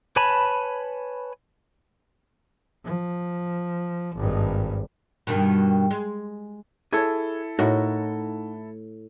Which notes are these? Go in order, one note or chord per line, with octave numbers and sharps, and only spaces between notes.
B4 C#5 G#5 A5 B5
F3
G#1 G2
G2 B2 D#3
G#3
E4 G#4 A4 C#5
A2 D#4 F#4 A#4